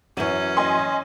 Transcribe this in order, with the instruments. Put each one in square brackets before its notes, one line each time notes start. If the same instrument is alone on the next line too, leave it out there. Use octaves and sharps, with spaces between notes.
[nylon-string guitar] F#2 E3 [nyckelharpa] C#4
[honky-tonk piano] D#5 G#5 C6